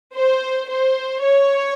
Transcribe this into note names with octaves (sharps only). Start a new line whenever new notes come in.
C5
C5
C#5